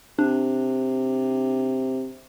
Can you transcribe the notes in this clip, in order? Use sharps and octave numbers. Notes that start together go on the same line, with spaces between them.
C3 D4